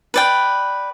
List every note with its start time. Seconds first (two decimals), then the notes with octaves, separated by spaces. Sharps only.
0.14 B4 D5 G5